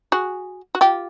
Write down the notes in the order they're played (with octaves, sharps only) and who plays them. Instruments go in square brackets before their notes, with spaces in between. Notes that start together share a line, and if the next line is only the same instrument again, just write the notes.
[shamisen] F#4 G#4
F#4
F4 G4